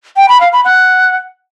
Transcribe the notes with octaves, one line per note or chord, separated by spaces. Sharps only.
G5
B5
F5
B5
F#5